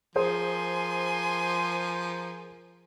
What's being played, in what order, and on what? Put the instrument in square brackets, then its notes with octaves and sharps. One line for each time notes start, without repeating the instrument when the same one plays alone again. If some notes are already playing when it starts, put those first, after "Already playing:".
[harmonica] F3 [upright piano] G#4 C5 [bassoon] A#4 [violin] G#5 C6